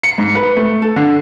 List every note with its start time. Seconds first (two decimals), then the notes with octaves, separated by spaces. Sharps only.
0.03 C#7
0.18 G#2
0.35 B4
0.57 A3
0.82 A4
0.96 D3